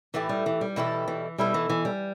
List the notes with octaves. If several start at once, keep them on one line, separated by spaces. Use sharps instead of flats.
A2 E3 A3 G4 B4
G3
E3
G3
B2 E3 G3 E4 A4
E3
B2 G3 B3 E4 A4
E3
E3
G3